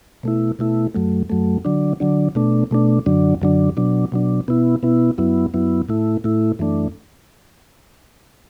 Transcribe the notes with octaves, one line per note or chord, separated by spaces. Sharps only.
B2 A3 E4
B2 A3 E4
F#2 F#3 A3
F#2 F#3 A3
D3 F#3 D4
D3 F#3 D4
B2 A3 D4
B2 A3 D4
F#2 D3 F#3 D4
F#2 D3 F#3 D4
B2 F#3 D4
B2 F#3 D4
B2 B3 E4
B2 B3 E4
F#2 F#3 B3 E4
F#2 F#3 B3 E4
A2 A3 E4
A2 A3 E4
F#2 E3 A3 D4